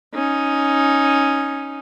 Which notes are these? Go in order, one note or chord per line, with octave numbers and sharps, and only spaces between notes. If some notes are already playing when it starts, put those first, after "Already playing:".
C#4 D#4